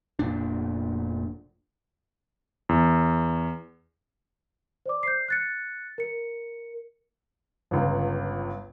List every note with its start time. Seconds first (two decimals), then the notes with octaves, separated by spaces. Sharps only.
0.19 F1 A#2 D4
2.69 E2
4.86 C5 D5 D6
5.03 G6 C7
5.28 F#6 A6 C#7
5.98 A#4 C#7
7.71 G1 C#2